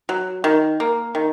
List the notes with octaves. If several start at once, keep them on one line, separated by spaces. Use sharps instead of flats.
F#3
D#3
A#3
D#3